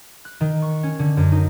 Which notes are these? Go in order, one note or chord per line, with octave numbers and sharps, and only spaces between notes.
F#6
D#3
C#6
C#4
D3
F#2
D#4